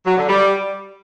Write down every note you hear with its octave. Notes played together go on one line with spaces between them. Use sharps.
F#3
D3
G3